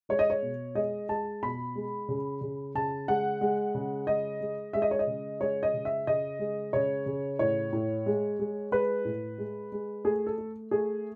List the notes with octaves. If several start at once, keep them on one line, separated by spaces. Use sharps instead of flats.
G#3 C#5
D#5
C#5
B2
G#3 D#5
G#3 A5
B2 B5
G#3
C#3
C#3
C#3 A5
G#3 F#5
G#3
C#3
G#3 D#5
G#3
G#3 E5
D#5
C#5
D#5
C#3
G#3 C#5
D#5
C#3
E5
C#3 D#5
G#3
C#3 C#5
C#3
A2 C#5
A2
G#3
G#3
G#3 B4
A2
G#3
G#3
A3 G#4
A4
A3
A3 G#4